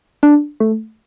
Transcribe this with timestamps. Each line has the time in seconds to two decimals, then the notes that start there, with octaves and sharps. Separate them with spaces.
0.23 D4
0.60 A3